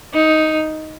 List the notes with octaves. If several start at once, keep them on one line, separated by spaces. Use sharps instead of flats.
D#4